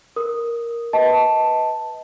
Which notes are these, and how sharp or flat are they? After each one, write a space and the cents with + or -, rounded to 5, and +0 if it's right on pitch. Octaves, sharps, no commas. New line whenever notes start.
A#4 +0 D#6 -5
B4 +0 D#5 +30 A5 +0